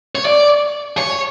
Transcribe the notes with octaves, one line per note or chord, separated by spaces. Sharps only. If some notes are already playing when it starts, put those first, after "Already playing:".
C#5
D5
C#5